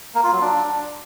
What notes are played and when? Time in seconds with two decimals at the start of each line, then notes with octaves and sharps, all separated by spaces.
0.15 A#3
0.24 F4
0.32 F#3
0.41 D4